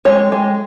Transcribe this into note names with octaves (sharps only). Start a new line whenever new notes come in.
G#3 C#5
G#3